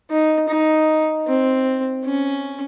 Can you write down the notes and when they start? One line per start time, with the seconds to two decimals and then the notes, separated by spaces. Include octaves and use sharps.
0.11 D#4
0.49 D#4
1.27 C4
2.05 C#4